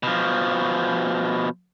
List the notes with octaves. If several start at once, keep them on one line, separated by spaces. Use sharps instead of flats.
B2 F3